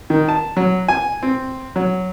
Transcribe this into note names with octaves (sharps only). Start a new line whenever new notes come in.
D#3
A5
F#3
G#5
C4
F#3